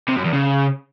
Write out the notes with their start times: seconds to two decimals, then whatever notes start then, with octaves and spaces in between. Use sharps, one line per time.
0.08 C3
0.17 F#2
0.25 E2
0.33 C#3